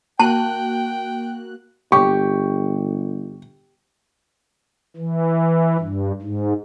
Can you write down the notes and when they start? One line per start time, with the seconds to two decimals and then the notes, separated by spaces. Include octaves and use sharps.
0.19 A#3 F#4 G5 A5 F#6
1.92 G1 G4 C#6
4.97 E3
5.80 G2
6.22 G#2